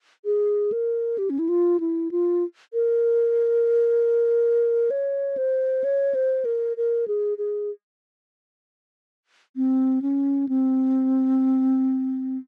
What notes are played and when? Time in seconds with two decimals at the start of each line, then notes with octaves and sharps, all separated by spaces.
0.25 G#4
0.72 A#4
1.18 G4
1.30 C#4
1.39 E4
1.49 F4
1.80 E4
2.11 F4
2.73 A#4
4.91 C#5
5.37 C5
5.84 C#5
6.15 C5
6.45 A#4
6.77 A#4
7.08 G#4
7.38 G#4
9.56 C4
10.02 C#4
10.49 C4